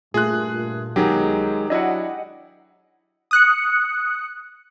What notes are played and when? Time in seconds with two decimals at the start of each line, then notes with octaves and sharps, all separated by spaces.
0.14 G2 A#2 A3 F4 G#4 F#6
0.96 B1 D#3 F#3 G#3 G4 G#4
1.70 F#3 D4 E4 D#5 F#5
3.31 D#6 F#6 C#7